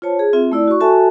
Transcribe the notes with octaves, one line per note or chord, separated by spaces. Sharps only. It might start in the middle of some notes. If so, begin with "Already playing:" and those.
F4 C5 C#5 A5
G#4
C4 F4 E5
A3 E4 D5
F#4 C#6
F#4 A4 E5 G#5 A5